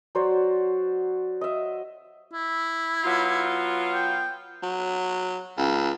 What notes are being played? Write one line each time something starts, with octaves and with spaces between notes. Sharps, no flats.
F#3 F#4 C5 D5
D#5 E5
E4
F#3 B3 F4
G5
F#3
C#2